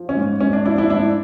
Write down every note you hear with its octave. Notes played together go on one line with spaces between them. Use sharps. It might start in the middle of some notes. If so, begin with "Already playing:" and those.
Already playing: F3
C#4
G#2
G#2 C#4
D4
F3 D4 E4
D4 E4
G#2 D4 E4